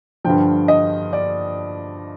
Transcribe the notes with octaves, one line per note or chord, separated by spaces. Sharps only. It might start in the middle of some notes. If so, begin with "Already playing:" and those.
G2 D3 F3 G5
D#5
D5